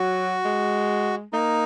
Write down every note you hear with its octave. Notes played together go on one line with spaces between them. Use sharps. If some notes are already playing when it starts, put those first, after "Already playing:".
Already playing: F#3 F#4
G#3
A#3 D#4